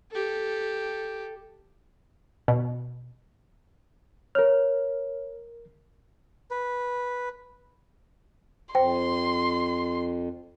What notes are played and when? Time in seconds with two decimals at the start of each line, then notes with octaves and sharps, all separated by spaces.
0.11 G4 A4
2.48 B2
4.35 A#4 C#5 F6
6.51 B4
8.75 F2 C5 G5 C6